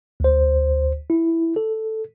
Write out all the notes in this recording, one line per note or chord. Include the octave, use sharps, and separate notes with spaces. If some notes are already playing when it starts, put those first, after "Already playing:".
D2 C5
E4
A4